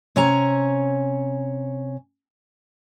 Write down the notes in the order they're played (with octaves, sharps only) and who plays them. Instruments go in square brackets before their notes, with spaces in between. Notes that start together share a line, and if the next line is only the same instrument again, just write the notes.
[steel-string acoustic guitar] C3 C#4 C#5 G#5 A#5